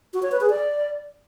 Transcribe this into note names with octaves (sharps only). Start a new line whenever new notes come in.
F#4
C#5
B4
G#4
D5